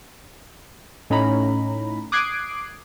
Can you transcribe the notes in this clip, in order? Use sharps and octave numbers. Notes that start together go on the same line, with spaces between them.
A2 C#4 D#4 A#5 B5
D6 D#6 F#6 G#6 C7 D7